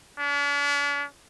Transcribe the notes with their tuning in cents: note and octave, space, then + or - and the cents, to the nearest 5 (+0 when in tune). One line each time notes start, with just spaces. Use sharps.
D4 -45